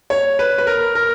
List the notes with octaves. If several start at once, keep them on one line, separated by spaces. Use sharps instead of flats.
C#5
B4
B4
A#4
A#4